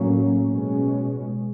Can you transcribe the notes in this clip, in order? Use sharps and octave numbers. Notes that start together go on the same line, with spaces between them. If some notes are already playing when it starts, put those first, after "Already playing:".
Already playing: A2 F#3 A#3 C#4
B2 G#3 C#4